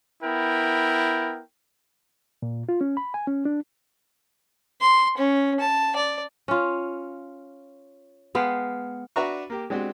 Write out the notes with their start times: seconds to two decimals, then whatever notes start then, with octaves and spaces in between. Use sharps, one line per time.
0.23 B3 E4 A#4 G5
2.42 A#2
2.69 F4
2.81 C#4
2.97 B5
3.14 G#5
3.27 C#4
3.45 D4
4.81 C6
5.17 C#4
5.60 A5
5.96 D5
6.48 C#4 F4
8.35 G#3 B3 F5 G5
9.16 D4 F#4 B4 E5 A#5 C#6
9.50 A#3 G4
9.70 G#3 C4 D4 F#4 G4